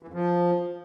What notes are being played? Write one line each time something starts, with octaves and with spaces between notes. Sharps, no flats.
E3
F2
F3